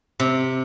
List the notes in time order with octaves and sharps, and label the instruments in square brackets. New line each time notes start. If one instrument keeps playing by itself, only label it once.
[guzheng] C3